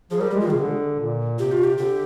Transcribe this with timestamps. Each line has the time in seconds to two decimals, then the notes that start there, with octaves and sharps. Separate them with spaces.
0.11 F3 G#4
0.20 G3 A#4
0.31 G4
0.34 G#3
0.40 F4
0.47 D#3 G#4
0.54 C3
0.60 D3
0.99 A#2
1.39 C3 G4
1.51 F4
1.64 G4
1.78 D3 G4